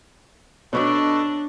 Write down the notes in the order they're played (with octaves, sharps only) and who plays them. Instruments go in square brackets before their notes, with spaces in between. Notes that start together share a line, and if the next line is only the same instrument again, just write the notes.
[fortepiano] B2 [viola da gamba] D4 [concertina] A4 B4 D#5 [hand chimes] C#5 C#6 D6